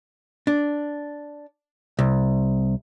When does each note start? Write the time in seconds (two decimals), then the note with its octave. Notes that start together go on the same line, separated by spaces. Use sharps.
0.47 D4
1.99 C2